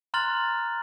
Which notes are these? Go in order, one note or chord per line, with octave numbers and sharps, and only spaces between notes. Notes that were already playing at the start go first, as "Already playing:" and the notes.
A#5 C6 F6 F#6 A6 F#7